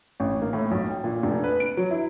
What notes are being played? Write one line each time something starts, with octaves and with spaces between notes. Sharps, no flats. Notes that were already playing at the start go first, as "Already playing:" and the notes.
A1
A#3
A2
B1
G5
A#2
F1
B4
D7
F#3
E4